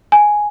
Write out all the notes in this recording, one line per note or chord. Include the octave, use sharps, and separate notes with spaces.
G#5